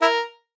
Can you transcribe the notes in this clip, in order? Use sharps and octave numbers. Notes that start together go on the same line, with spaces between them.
E4 A#4